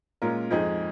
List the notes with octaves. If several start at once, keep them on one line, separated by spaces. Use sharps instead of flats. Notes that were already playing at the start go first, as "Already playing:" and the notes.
A#2 G#3 C#4 F4 A#4
F2 F3 G#3 D#4 G#4